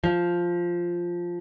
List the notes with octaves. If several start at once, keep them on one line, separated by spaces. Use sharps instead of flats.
F3